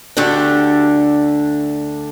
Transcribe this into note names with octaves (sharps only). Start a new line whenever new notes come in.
D2 D3 A3 D4 G4